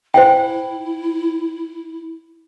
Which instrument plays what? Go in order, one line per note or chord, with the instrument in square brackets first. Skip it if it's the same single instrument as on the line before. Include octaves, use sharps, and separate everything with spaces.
[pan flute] E4 [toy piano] C5 F5 G5